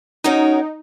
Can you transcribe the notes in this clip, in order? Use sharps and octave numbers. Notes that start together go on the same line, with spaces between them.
C#4 D#4 F#4 A#4